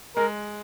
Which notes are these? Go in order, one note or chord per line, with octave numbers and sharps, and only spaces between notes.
G#3 A#4